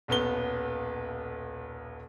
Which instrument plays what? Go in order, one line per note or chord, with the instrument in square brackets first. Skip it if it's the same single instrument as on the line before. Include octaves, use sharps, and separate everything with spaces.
[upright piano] D#1 B1 B3 G7